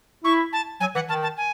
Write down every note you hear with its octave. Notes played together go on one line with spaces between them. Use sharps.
E4 C#6
A5
F#3 G#5
E3 F#5
D#3 A5
A5
G#5